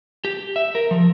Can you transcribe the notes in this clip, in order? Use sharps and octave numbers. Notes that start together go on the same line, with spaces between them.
G4
E5
A#4
F3